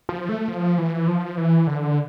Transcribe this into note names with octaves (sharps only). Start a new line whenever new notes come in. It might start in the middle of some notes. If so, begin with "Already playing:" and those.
F3
A3
F3
E3
F3
E3
D3